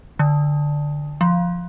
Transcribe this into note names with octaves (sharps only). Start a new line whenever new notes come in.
D3
F3